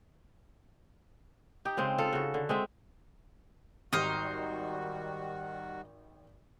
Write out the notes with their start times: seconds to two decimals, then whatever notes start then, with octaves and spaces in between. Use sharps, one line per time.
1.65 D#4 G4
1.77 C#3 G#3 C4
1.98 F4 A4 F5
2.13 C#3 F#4
2.34 D3
2.49 G#3 C4 E5
3.93 G#1 D#3 G3 D#4 F#4 G4 C5 F6